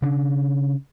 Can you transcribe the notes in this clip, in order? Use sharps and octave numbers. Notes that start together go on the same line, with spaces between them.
C#3 D4